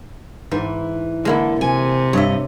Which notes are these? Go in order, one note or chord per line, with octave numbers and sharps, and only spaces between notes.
G#2 E3
D3 G#3 A#3 E4
C3 G#5
G2 C#5 D#5 E5